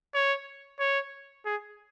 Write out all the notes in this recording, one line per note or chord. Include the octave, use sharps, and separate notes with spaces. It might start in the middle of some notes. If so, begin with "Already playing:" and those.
C#5
C#5
G#4